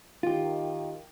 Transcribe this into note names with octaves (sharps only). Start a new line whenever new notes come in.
D#3 F4 G4